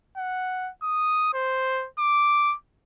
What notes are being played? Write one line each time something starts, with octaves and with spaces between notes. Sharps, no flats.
F#5
D#6
C5
D6